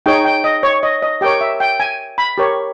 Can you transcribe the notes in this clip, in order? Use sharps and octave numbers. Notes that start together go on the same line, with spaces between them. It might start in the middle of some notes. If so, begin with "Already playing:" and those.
D#4 G#4 C#5 G5
G5
D#5
C#5
D#5
D#5
G4 A#4 C#5 G5
E5
G5
G#5
B5
G4 A#4 C#5